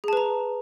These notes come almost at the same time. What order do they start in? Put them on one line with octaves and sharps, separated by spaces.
G#4 A5 B4 A#5